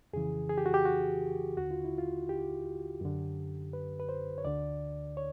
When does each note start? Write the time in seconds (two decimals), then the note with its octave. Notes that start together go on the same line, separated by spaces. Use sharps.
0.13 F2 C#3 E3 G#4
0.49 G#4
0.58 G4
0.66 F#4
0.74 G4
0.85 F#4
1.57 D#2 D3 F#4
1.71 F4
1.85 E4
1.98 F4
2.29 G4
3.01 F#2 D3
3.73 B4
4.00 B4
4.09 C5
4.38 C#5
4.45 D2 D3 D5
5.17 C#5